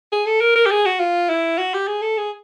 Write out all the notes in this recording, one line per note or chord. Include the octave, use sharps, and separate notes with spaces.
G#4
A4
A#4
A#4
G4
G#4
F#4
F4
E4
F#4
G4
G#4
A4
G#4